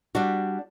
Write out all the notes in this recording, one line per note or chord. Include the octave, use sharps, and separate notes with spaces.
G3 D4 F#4